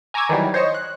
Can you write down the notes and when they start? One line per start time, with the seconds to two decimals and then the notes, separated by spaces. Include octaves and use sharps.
0.14 G#5 A#5 C#6 D6 E6 G#6
0.29 D#3 E3 F#3 G3
0.54 C5 C#5 D#5 C#6
0.74 F#6